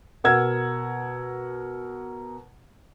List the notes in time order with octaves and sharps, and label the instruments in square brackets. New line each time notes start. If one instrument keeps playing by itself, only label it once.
[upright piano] B2 A#4 F#5 A#5 E6 G#6